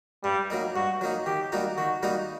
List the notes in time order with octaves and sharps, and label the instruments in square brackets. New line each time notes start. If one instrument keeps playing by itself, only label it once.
[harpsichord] G2 [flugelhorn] G3
[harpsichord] F#3 A#3 D#4
[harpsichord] G2 [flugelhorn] F#4
[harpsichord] F#3 A#3 D#4
[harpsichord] D#3 [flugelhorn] G4
[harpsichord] G3 A#3 D#4 F#4
[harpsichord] D#3 [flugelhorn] F#4
[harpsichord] G3 A#3 D#4 F#4